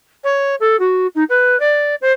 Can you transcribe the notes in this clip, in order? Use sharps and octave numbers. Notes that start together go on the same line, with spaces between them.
C#5
A4
F#4
D#4
B4
D5
C5